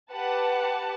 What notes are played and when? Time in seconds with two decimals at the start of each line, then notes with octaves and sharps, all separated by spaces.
0.12 G4 B4 F#5 A5